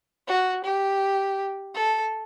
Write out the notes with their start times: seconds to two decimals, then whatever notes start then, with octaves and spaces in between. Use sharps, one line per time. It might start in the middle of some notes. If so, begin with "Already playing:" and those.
0.28 F#4
0.64 G4
1.75 A4